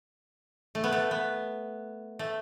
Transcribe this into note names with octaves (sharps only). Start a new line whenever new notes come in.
A3
B3
A3
B3
A3